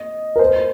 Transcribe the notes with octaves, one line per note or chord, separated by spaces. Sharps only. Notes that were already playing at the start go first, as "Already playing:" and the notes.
Already playing: D#5
A#4
C5